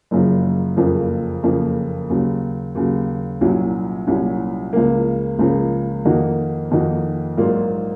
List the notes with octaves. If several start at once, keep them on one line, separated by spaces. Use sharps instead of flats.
F#1 F#2 C#3 F3
F#1 F2 C#3 F3 A#3
F#1 F2 C#3 F3 A#3
D#2 C#3 F#3
D#2 C#3 F#3
C2 A#2 F#3 C#4
C2 A#2 F#3 C#4
C#2 C#3 F3 A#3
C#2 C#3 F3 A#3
F2 D#3 A#3 D#4 F#4
F2 D#3 A#3 D#4 F#4
A#1 G#2 F#3 A#3 F4